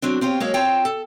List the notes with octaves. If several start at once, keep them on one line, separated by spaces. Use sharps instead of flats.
F#3 C4 D4
C4 F4 G4 C#5
F#3 G#3 A#3 C#4 C#5 F5
C4 F4 C#5 G5 A5
A4